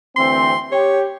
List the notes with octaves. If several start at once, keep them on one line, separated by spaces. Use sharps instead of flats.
D2 E3 C4 C6
G4 C#5